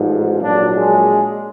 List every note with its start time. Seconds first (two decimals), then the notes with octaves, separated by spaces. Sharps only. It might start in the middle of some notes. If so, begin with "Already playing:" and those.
Already playing: A1 G#2 F3
0.42 A#1 A#2 F#3 D4
0.76 G#3